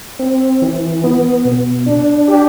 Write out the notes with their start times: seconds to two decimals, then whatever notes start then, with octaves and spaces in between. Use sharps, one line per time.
0.19 C4
0.62 E3
1.04 B3
1.45 B2
1.86 D4
2.28 G4